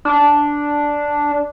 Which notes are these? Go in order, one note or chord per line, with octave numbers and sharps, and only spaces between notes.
D4